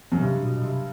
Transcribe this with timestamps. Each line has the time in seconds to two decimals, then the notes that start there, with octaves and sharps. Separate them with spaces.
0.12 F#2
0.21 G2 C3
0.43 B2
0.57 B2
0.65 C3